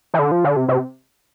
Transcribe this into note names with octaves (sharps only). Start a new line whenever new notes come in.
E3
D3
F3
D3
C3
C3